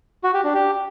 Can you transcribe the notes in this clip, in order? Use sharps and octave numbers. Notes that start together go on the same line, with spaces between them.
F#4
G4
D4
G4